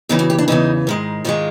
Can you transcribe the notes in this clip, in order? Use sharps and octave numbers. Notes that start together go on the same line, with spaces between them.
E2 C#3 E3 D#4
F#4
G4
D4
E2 C#3 E3 D#4
G#2 D#3 G#3
G#2 D#3 G#3 F4